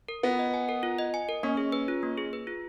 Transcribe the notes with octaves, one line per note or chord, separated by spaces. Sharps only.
A#4
B3 F4
D#5
G#5
A#4
F4
D#5
G#5
A#4
A#3 C#4
G#4
B4
F4
A#3
G#4
B4
F4